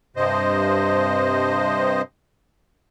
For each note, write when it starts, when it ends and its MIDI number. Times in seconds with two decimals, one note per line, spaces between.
0.16 2.02 43
0.16 2.02 48
0.16 2.02 72
0.16 2.02 75